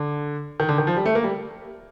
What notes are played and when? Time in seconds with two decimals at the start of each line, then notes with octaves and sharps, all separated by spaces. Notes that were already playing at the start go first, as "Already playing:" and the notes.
Already playing: D3
0.60 D#3
0.69 D3
0.78 D#3
0.87 F3
0.97 G3
1.06 A3
1.15 A#3
1.24 G3